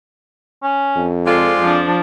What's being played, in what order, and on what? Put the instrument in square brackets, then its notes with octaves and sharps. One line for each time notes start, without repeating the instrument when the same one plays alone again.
[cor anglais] C#4
[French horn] F2
[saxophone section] G#3 C4 F4 [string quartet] A4 [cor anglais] D5
[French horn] F2 [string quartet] F3 D4